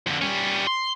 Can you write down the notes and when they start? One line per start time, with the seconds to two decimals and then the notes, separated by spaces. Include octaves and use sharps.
0.07 F2 D3
0.21 G3 C#4
0.67 C6